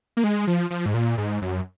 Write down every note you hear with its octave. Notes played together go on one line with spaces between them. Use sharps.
A#3
G#3
F3
F3
G#2
A#2
G#2
F#2